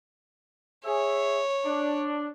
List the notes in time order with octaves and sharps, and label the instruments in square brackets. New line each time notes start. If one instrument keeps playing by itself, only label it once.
[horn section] G#4 E5 [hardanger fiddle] C#5
[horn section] D4